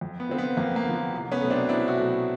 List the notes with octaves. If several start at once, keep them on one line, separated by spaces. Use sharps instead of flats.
F2
B3
D3 F3 C4
B3
F2 A#3
A#3
D3 F3
C2
B3 C#4
B2 F#3 A3
C4 D4
C2 D4 E4
E4 F#4
B2 F#3 A3